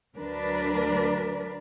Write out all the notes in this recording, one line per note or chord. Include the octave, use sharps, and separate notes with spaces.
D2 F#3 D4 A#4 B4 D5